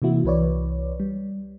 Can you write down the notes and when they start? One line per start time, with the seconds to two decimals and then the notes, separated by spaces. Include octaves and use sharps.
0.02 C3 E3 A#3 E4 F#4
0.24 C2 E3 B4 C#5 D5
1.00 G3